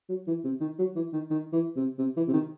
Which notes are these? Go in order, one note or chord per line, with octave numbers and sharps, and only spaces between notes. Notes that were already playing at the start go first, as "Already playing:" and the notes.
F#3
E3
C3
D#3
F#3
E3
D#3
D#3
E3
C3
C3
E3
C3
D#3